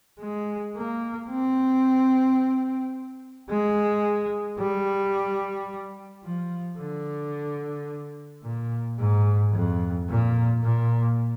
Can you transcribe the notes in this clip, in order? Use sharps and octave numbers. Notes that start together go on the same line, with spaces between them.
G#3
A#3
C4
G#3
G3
F3
D3
A#2
G#2
F2
A#2
A#2